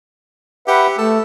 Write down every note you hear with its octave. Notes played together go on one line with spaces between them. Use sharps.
G4 B4 E5 F#5
A3 A4